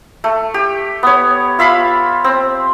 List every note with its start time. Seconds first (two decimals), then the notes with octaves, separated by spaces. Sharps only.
0.24 A3
0.54 G4
1.03 B3 C#5
1.59 F4 E5 F5 B5
2.24 C4